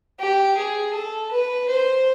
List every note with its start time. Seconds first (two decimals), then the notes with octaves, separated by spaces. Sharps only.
0.20 G4
0.57 G#4
0.94 A4
1.31 B4
1.69 C5